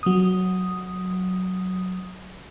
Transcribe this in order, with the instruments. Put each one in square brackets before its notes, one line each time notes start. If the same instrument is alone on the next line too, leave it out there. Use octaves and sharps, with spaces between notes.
[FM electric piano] F#3 D#6